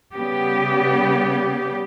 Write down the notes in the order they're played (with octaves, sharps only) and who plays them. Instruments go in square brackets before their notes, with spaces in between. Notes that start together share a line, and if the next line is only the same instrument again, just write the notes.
[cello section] C#3 G3 B3 G4